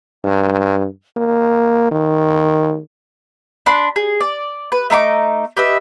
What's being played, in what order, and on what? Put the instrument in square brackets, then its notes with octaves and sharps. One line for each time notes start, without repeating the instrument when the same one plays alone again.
[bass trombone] G2
A#3
D#3
[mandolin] D4 B5 C6 F#6
G#4
D5
B4
A3 D#4 B5 D6
G4 B4 D#5 E5